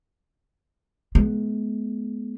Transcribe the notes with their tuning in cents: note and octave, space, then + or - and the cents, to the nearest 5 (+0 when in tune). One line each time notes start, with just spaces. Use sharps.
G#3 +40 B3 +0